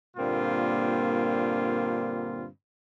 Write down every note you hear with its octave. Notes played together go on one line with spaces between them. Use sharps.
G2 A#2 D3 A#3 C4 F4